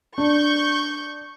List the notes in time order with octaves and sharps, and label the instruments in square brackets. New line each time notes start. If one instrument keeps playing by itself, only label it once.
[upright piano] D4 [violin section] C#6 G6